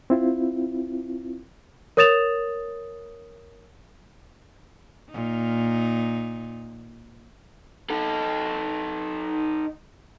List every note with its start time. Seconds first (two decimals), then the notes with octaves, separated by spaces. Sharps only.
0.10 C4 E4 F4
1.97 A#4 C#5 D#6 A6 E7 F7
5.11 A#2 D#4
7.90 D#4 A4